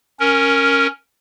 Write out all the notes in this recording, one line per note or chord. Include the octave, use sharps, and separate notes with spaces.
C#4 A#4